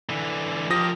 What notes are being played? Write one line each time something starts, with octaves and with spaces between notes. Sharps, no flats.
D3 E3
F3 G4 A#4 D#6 A#6